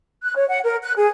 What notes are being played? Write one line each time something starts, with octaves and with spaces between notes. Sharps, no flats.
F#6
C#5
F#5
A#4
F#6
G#4